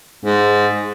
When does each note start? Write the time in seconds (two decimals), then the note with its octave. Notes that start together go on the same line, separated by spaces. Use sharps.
0.25 G#2